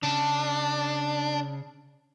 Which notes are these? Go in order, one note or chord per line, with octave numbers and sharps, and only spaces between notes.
C#3 D4